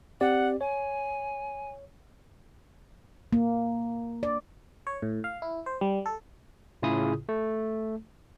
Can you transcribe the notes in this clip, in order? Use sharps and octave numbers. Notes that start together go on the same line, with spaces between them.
C4 G4 D5 F#5
C#5 G#5
A#3
D5
C#5
A2
F5
E4
C5
G3
A4
A2 C#3 E4 F4 G#4 D#6
A3